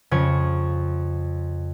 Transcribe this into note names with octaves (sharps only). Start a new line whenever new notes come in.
F2 C#3 C#6 G#6